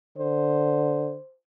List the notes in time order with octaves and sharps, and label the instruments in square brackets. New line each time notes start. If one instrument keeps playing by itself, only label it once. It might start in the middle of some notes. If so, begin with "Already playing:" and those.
[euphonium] D3 [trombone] C5